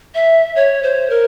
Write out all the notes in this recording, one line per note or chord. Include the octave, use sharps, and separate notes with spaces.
E5
C#5
C5
A#4